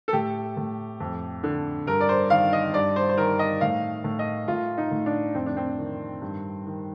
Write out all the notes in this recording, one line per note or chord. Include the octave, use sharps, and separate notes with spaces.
A4
A2 G4
A2
F2
D3
G2 A#4
D5
C5
D#3 F5
D#5
G2 D5
C5
C5
D#3 A#4
D#5
A2 F5
A2
D#5
A2 F4
D#4
A2
D4
F2 C4
D4
C4
D#3
G2
D#3